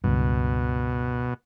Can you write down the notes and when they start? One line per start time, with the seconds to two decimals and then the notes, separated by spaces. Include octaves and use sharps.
0.04 C#2 G2 B2